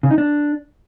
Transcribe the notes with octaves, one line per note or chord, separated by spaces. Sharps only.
C#3
D#4
D4